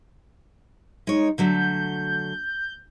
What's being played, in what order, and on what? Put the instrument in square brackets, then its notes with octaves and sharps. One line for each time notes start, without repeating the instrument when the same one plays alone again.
[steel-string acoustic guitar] G#3 C#5 [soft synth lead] D#4
[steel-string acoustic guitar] D3 F#3 A3 [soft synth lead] G6